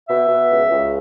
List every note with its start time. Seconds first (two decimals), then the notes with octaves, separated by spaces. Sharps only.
0.09 B2 E5
0.29 B2
0.50 C#2
0.70 C#2